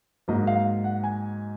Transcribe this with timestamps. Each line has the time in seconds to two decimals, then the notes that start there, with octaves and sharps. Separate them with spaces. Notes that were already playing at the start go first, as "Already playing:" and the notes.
0.28 G#2 F#3 A#3 D#5
0.47 F5
0.84 F#5
1.04 G#5